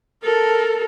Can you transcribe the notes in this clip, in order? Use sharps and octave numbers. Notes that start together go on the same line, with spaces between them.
A4 A#4